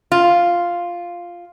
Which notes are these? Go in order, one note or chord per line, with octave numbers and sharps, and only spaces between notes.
F4